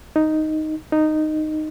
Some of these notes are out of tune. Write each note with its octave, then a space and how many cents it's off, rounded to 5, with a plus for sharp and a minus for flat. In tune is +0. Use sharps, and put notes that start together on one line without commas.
D#4 +0
D#4 -10